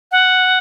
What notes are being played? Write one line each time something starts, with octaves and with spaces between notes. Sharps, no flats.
F#5